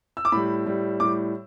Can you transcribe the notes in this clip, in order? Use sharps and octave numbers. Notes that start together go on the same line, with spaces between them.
E6
D6
A2 G3 B5
A2 G3
A2 G3 D6